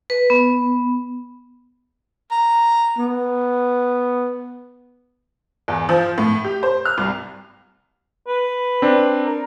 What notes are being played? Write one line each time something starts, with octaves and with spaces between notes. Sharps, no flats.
B4
B3
A#5
B3
E2
F3
A2
G4
C5
F6
C2
B4
C4 D4
A#4